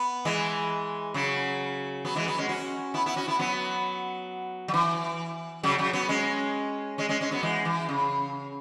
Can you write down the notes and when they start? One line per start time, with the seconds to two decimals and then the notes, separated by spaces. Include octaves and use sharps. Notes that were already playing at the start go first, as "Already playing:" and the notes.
Already playing: B3
0.25 E3 G#3
1.14 C#3 F#3
2.05 F#3 B3
2.16 E3 G#3
2.26 F#3 B3
2.38 G#3 C#4
2.49 C#4 F#4
2.94 B3 E4
3.06 B3 E4
3.16 C#4 F#4
3.28 B3 E4
3.39 F#3 B3
4.68 F#3
4.74 E3
5.63 C#3 F#3
5.78 C#3 F#3
5.93 F#3 B3
6.09 G#3 C#4
6.98 G#3 C#4
7.09 G#3 C#4
7.21 G#3 C#4
7.31 F#3 B3
7.43 E3 G#3
7.65 E3
7.89 C#3